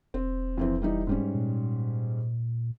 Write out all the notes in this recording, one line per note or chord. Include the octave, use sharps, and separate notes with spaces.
E1 C4
F2 E3 C4
E3 G3 D#4
G#2 G3 C#4
A#2